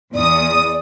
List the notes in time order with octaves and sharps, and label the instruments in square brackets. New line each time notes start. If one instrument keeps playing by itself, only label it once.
[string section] E2 D#6 [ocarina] D5